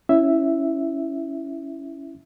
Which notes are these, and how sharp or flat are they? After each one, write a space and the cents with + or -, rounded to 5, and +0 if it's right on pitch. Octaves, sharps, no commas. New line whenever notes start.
C#4 +5 E4 +0 E5 +0